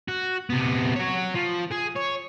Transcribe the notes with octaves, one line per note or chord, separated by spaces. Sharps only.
F#4
C3 B3
F#4 C#5
F3
G#4
C#5